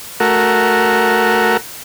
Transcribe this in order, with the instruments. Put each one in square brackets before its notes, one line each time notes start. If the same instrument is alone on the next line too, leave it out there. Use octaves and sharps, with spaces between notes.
[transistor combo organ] A3 F#4 A#4